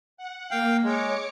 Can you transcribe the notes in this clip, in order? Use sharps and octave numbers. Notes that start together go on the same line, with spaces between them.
F#5
A#3 F5 G5
G#3 C#5 D6 C#7